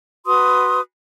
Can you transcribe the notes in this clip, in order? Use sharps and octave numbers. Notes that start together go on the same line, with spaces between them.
F#4 B4 C6 D#6